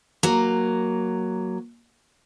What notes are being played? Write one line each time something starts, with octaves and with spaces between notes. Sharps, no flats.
F#3 A#3